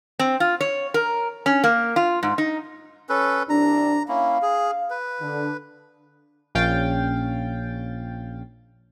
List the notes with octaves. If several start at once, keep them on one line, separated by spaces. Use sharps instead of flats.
C4
F4
C#5
A#4
C#4
A#3
F4
G#2
D#4
C#4 A4 B4
C2 D4 A#5
A#3 C#4 E4 F5
G#4
B4
D3
A#1 C#4 F5 G5 A6